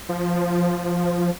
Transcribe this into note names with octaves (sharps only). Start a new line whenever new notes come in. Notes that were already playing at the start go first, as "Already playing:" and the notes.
F3